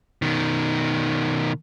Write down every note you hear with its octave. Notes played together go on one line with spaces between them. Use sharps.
B2 D#3